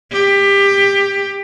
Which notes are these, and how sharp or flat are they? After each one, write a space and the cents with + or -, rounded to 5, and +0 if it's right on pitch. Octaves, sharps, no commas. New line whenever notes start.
G4 +20